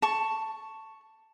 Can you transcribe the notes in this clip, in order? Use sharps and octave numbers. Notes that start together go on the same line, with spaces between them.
A5 C#6